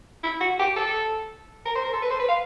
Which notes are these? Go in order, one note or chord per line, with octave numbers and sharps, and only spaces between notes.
E4
F#4
G4
A4
A#4
C5
A#4
A4
B4
C5
B4
F5